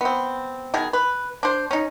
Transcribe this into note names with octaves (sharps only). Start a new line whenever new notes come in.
B3 C4
B2 D#3 G#4
B4
D4 C5
C#4 D#4